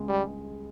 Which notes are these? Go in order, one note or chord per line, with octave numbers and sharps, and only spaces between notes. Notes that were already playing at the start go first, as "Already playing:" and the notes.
Already playing: C#2 G#3
G3
G#3